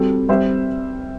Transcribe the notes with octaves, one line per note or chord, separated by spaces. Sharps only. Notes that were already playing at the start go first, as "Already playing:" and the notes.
Already playing: G3 C4 F#4 A4
G3 C4 G4 C5 E5